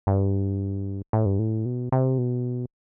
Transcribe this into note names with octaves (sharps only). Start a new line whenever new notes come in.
G2
A2
G2
A2
B2
C3
B2